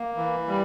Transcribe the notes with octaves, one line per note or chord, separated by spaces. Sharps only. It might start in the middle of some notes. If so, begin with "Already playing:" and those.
Already playing: A#3
E3
G3